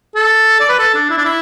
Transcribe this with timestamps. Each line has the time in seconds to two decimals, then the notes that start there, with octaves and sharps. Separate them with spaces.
0.15 A4
0.60 D5
0.69 B4
0.79 A4
0.94 D4
1.10 E4
1.18 D4
1.25 E4